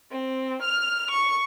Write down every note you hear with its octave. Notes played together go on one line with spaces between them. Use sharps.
C4
F6 F7
C#6